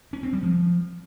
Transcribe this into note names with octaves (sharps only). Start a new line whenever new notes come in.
C#4
C4
G3
F3